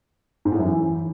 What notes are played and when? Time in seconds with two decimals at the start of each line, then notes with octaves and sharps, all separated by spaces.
0.45 G#2
0.52 A2
0.59 F#2
0.65 E3